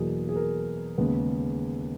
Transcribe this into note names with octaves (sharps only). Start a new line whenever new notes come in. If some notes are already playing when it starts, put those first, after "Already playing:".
Already playing: E2 B2 F#3 A#3 G#4
G#4
A#4
D#2 C#3 G#3 B3